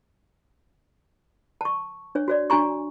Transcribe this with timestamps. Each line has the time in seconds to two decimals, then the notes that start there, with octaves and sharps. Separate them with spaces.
1.61 A5 C#6
2.15 D4 C#5
2.28 F#4 C#5 D5
2.50 D4 F#4 G#5 A#5 C#6